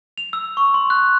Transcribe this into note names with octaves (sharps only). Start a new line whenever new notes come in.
F7
E6
C#6
C6
F#6